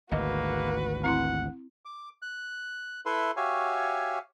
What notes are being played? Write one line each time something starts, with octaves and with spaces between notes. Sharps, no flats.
G#1 D2 A#3 F#4 B4 D#5
C4 E4 F#5 C6
D6
F#6
E4 A4 B4 E5 C6
F#4 G4 C#5 E5 F5 G#5